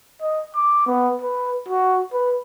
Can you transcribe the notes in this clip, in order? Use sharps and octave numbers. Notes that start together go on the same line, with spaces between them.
D#5
D6
B3
B4
F#4
B4